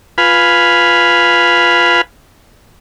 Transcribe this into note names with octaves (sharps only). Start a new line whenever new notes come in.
F4 B4 F5 G#5 B5